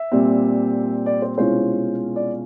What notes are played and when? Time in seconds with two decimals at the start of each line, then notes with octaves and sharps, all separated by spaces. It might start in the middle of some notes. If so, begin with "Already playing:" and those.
Already playing: E5
0.12 A#2 G3 C4
1.06 D5
1.22 C5
1.38 C2 B2 G#3 C#4 F4 C5
2.16 D5